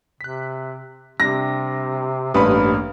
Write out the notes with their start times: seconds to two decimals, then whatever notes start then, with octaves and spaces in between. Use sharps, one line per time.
0.21 C3 F#6 B6
1.20 C3 G3 C4 D4 A#6
2.34 A1 G2 A#3 B4 B5 C6 D#6